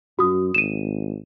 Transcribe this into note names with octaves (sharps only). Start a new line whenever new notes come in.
F#2 F#4 D#6
G#1 D#7 E7